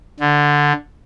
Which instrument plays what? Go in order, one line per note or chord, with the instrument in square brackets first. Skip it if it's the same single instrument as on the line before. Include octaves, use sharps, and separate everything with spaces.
[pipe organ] D3